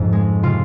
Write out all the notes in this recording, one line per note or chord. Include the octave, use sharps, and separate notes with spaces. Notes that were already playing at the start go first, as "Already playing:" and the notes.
Already playing: F2 G#2
G#3
C3 F4